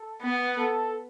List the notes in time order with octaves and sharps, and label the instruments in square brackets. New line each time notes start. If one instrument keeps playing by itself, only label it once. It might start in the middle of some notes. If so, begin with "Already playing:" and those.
Already playing: [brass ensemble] A4
[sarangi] B3 [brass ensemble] B4
[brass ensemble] A4